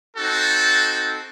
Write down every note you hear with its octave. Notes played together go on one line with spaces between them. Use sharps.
C4 D#4 F#4 A4